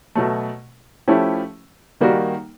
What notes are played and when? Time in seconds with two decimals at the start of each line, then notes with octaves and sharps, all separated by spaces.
0.15 B2 F#3 A3
1.08 F3 A3 C#4 E4 G4
2.00 D#3 G3 A#3 D#4 F#4